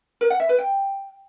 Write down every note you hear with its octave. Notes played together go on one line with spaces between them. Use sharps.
A#4
F#5
E5
B4
G5